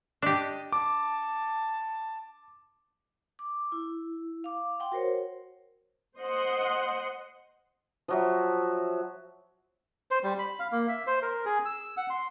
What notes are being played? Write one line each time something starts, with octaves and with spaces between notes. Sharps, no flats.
D4 G4 D#5
A5 D6
D6
E4
F5 D6
F#5 G5 C6
F#4 A#4 C5 C#5
C5 D#5 F#5 C6
F3 F#3 E5
C5
G3
B5
F5
A#3
E5
C5
A#4
G#4
E6
F#5
C6